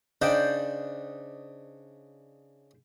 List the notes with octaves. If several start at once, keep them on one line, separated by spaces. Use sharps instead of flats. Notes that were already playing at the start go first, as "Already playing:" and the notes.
C#3 D4 D#4 C5 D5 G5